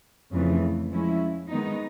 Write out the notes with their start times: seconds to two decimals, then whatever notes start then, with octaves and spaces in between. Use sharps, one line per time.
0.32 F2 C#3 E3 A3
0.91 F3 G#3 C#4 E4
1.49 D#3 G#3 B3 D#4